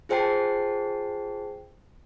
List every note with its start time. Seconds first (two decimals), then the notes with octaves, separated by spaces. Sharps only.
0.09 F4 G#4 C5 G5 A5 C7